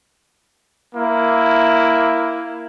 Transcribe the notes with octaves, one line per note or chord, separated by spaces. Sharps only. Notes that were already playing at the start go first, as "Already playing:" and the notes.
A#3 E4